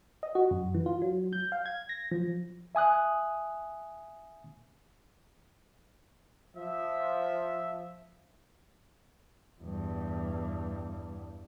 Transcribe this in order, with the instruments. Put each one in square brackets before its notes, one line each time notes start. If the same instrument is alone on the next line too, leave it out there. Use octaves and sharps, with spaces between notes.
[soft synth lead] D#5
F#4
F#2
E3
F4
F#3
G6
F5
G#6
A#6
F3
[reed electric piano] E5 G#5 D#6 F#6
[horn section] F3 E5
[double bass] E2 G2